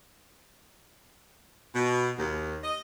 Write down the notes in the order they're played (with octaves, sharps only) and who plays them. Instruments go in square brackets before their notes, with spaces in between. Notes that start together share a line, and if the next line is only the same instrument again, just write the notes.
[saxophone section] B2
D#2
D#5